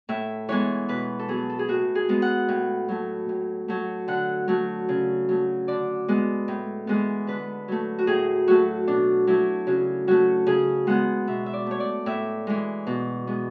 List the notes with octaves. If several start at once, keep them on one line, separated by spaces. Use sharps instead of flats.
A2 E5
E3 G#3 B3 C#5
B2 B4
A4
F#3 B3 G#4
A4
G#4
A2 F#4
G#4
G#3 B3
F#5
A2
F#3 A3
A2
F#3 A3
D3 F#5
F#3 A3
C#3
F#3 A3
D3 D5
G#3 B3
A2
E3 G#3 B3
D3 B4
F#3 A3
F#4
A2 G#4
F#3 A3 F#4
B2 D4
F#3 A3 E4
C#3 F#4
F#3 A3 F#4
C#3 G#4
G#3 B3 F#5
B2 E5
E5
D5
A3 C#5
D5
A2 E5
E3 G#3
B2
G#3 B3